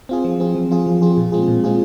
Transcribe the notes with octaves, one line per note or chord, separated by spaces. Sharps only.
C4 F4 G#4
F3
C4 F4 G#4
F3
C4 F4 G#4
F3
C4 F4 G#4
A#2
G#3 C4 F4 G#4
A#2
G#3 C4 F4 G#4